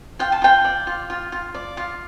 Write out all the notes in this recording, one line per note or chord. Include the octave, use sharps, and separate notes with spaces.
F4 G5
A5
F4 G5
D5
F4
F4
F4
D5
F4